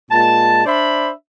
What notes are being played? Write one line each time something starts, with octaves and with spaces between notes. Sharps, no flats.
A#2 G#3 A5
D4 C5 D5 E5 B5